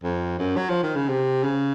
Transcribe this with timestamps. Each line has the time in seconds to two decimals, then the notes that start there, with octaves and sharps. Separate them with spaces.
0.03 F2
0.38 F#2
0.57 F#3
0.69 F3
0.83 D#3
0.95 C#3
1.09 C3
1.43 C#3